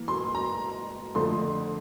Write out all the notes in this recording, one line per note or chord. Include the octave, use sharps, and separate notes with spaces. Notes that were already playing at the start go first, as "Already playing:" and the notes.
Already playing: E3 A#3
C6
A#5
F2 D3 F3 A3 C6